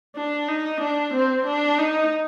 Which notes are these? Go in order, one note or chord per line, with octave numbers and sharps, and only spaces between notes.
D4
D#4
D4
C4
D4
D#4